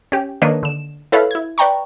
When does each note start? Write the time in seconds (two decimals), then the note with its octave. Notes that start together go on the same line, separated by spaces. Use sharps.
0.12 C#4 G4
0.42 D#3 A#3 D4 B4 C#5 D#5
0.63 D3 E7
1.12 E4 A4 B4 C#5 F5 B5
1.31 E4 G#6
1.58 B4 D5 G5 A#5 C#6